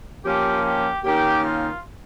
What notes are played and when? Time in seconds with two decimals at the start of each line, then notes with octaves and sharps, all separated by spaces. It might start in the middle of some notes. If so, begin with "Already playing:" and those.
0.25 F3 A#3 C#4 G4
0.64 G4
1.04 D#3 A#3 C#4 G4
1.44 F4